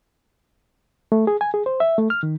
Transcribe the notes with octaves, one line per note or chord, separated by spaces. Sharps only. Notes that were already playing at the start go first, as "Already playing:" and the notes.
A3
G#4
G#5
G#4
C5
E5
A3
F6
D#3